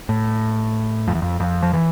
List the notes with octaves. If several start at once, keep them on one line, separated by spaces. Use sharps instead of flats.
A2
F2
E2
F2
F2
F3
E3